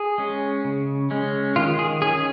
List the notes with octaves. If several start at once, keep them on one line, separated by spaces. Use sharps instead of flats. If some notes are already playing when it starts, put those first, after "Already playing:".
Already playing: G#4
G#3 C#4
C#3
G#3 C#4
D#3 F4
G#4
C#4 G#4